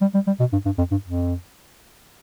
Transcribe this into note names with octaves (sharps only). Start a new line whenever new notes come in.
G3
G3
G3
B2
G2
G2
F2
G2
F2